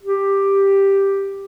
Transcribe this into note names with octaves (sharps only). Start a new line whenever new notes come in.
G4